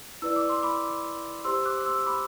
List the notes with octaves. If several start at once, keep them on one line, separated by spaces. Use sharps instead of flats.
E4 B4 D5 E6
D6
C6
B5 D6
G4 C5 C6 E6
D6 F#6
C6 E6
B5 D6